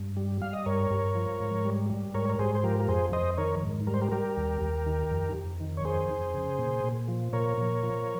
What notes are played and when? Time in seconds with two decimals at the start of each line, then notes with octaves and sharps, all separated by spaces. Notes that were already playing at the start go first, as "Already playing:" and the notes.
Already playing: G2
0.17 G3
0.42 G3 F5
0.53 D#5
0.66 G2 A#4 C#5
0.91 G2
1.15 F3
1.40 G#2
1.65 G3
1.90 G3
2.14 G#2 A#4 C#5
2.29 A#4
2.39 G#2 G#4 C5
2.55 C5
2.64 F3 G4 A#4
2.80 A#4
2.88 F2 G#4 C5
3.13 F2 C5 D#5
3.37 D#3 A#4 C#5
3.63 G#2
3.87 G3 A#4
3.94 C5
4.01 G4 A#4
4.12 G3 G4 A#4
4.37 D#2
4.61 D#2
4.86 D#3
5.11 F2
5.35 F2
5.60 D#3
5.77 C#5
5.85 F2 G#4 C5
6.10 F2
6.34 C#3
6.59 A#2
6.84 A#2
7.08 F3
7.33 A#2 A#4 C#5
7.58 A#2
7.83 F3